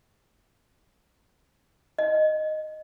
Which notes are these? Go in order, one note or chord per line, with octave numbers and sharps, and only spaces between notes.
D#5